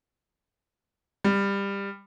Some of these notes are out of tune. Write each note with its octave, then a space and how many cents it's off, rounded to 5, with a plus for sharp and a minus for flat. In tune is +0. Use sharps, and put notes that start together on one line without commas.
G3 +20